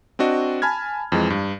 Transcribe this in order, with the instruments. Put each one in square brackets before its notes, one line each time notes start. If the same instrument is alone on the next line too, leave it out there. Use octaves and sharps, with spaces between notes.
[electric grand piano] C4 D4 F#4 D#5
G#5 A5 B5 F6 G#6
F2 E3 G#3
G2